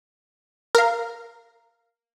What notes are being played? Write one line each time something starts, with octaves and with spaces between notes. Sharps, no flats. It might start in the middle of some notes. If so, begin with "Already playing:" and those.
A#4 F5